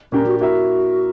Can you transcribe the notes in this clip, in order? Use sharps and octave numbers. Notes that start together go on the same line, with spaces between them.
A#2 A#3 C#4 D4 G4 A#4
F#4
A#3 E4 F#4 A#4 E5